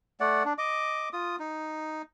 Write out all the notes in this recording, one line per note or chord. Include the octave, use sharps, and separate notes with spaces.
A3 D5 F#5
D4
D#5 D6
F4 D#6
D#4